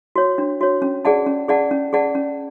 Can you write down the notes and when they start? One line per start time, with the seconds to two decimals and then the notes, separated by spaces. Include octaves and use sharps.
0.16 F#4 C#5
0.38 D4
0.61 F#4 C#5
0.82 C#4
1.05 G#4 D5 F#5 A5
1.26 C#4
1.48 G#4 D5 F#5 A5
1.71 C#4
1.93 G#4 D5 F#5 A5
2.15 C#4